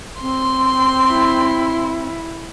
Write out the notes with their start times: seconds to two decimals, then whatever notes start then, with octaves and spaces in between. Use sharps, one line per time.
0.22 C4 C6
1.08 E4